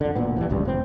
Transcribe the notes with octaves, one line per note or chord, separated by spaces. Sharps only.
F2 D3
E1 D2 A#2 B3
G2 E3 F3
D1 G#1 C#2 G3
F1 C4